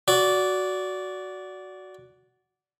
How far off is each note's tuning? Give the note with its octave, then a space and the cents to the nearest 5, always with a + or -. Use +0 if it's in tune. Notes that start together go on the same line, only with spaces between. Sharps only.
F#4 +0 D5 -15